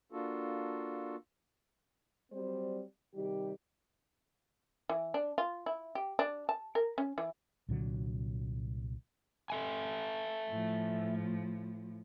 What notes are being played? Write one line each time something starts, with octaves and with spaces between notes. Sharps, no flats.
A#3 D4 F4 F#4 A4
F#3 G3 C4 C5 D5
C3 D#3 G3 G4
E3
D4
F4
E4
G4
D4
A5
A#4
C#4
E3
C2 A#2 D3 F#3
A4 E5 G#5
A2 F3